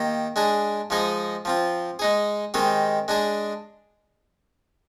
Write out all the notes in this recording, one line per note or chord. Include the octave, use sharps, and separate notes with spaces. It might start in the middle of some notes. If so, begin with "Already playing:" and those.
Already playing: D#3 A#3 G4
G#3 D4 G#4
F3 G#3 D#4 G#4
F3 C4 F4
G#3 D#4 G#4
D#3 G#3 C4 G4
G#3 D4 G#4